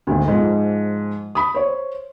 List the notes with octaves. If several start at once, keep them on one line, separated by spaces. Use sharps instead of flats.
G#1 D2
G#2 F3
B5 D#6
C5 C#5